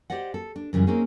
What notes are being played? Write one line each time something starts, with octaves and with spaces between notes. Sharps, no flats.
G4 C5 D5 D#5 F#5
A4
D4
F#2 C#3 E3 G3
A#3 C4 C#4 D#4 G#4